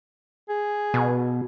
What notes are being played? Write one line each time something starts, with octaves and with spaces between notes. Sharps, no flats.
G#4
B2